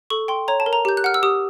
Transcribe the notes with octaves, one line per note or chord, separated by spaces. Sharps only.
A4 C#6
G5 C6
C#5 A#5
A5
A#4
A#5
G4 G6
F#6
F#5 F6
E6
G4 D#6